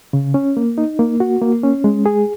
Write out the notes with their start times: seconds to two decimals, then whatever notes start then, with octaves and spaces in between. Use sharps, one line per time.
0.13 C#3
0.34 C#4
0.57 A#3
0.78 D#4
0.99 A#3
1.20 F#4
1.42 A#3
1.63 C#4
1.84 G#3
2.06 G#4